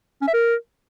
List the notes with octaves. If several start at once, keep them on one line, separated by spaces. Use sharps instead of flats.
C#4
E5
A#4